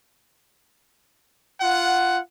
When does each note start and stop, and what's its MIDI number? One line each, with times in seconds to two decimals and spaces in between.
1.61 2.19 65
1.61 2.19 78